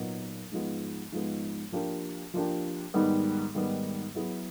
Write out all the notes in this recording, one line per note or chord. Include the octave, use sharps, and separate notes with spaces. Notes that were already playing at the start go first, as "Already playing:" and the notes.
Already playing: A#2 F#3 B3 D#4
G#2 F3 G#3 B3
G#2 F3 G#3 B3
F3 A#3 D4 G4
F3 A#3 D4 G4
G#2 D#3 G3 B3
G#2 D#3 G3 B3
F#3 B3 E4 G#4